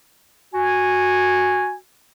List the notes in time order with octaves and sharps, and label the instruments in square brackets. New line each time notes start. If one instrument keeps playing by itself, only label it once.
[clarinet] F#4 [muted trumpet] G#5